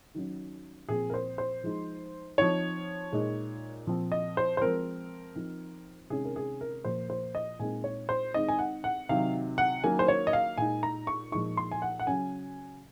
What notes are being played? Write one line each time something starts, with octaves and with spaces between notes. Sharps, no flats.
D#3 F#3 C#4
A#2 F3 C4 G#4
A#4
C5
C5
F3 G#3 D#4
F3 C4 D#4 C#5
A#2 G#3 D#4
A#2 F3 C4
D#5
C5
C5
F3 G#3 C4 A#4
F3 C4 D#4
C3 D#3 G#3 C#4 G#4
A#4
G#4
A#4
A#2 F3 A#3 C5
C5
D#5
A#2 G#3 C4 D#4 G#5
C#5
C5
D#3 G#3 C4 D#4 D#5
G#5
F#5
F#5
C3 D#3 F#3 F5
F#5
D#3 F#3 A#3 C#4 G#5
C5
C#5
D#5
F5
A#2 G#3 D#4 G#5
A#5
C#6
A#2 F3 G#3 D#4 C#6
C6
G#5
F#5
F#5
C#3 F#3 C#4 G#5